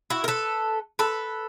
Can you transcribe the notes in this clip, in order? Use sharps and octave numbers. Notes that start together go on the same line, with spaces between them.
E4 F#4
A#4
A4 B4
A4 B4